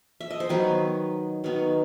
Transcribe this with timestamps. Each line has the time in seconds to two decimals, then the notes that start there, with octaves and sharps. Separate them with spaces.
0.21 E5
0.31 D#5
0.40 C5
0.49 D#3 F#3 B3 D#4 B4
1.44 D#3 F#3 B3 D#4